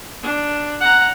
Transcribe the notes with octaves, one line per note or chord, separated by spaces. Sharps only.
D4
F#5 A#5